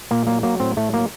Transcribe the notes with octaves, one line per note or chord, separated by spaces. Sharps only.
A#2 A#3
F#3 A#3
F#3 A#3
A2 C4
A2 A3
F#3 A#3